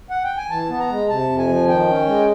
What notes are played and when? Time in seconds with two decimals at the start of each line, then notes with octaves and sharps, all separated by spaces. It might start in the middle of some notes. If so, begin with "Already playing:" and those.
0.10 F#5
0.24 G5
0.37 G#5
0.50 E3 A5
0.69 B3 A5
0.79 A#5
0.89 G#3
1.09 C3 A5
1.29 F2
1.38 G#5
1.48 F3
1.68 D#3 G5
1.88 C#4
2.07 G#3